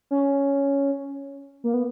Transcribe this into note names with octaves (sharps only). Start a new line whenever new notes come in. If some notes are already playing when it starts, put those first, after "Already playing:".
C#4
A#3
B3